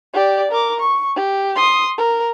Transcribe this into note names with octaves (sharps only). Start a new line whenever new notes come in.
G4 D5
A#4 D6
C#6
G4
C6 D#6
A#4